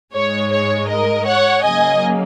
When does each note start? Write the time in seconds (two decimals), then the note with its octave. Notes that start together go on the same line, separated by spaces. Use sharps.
0.13 G#2 G#3 C#5
0.51 C#5
0.88 A#4 D#5
1.25 C#5 F#5
1.62 C#3 F#3 A#3 D#5 G#5